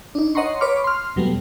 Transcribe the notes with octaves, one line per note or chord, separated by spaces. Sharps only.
D4 D#4
C#5 D#5 F#5 A#5 C6 C#6
B4 C#5 B5 C#6 D6 F6
C6 F6
E2 B2 F#3 G3 A3 B3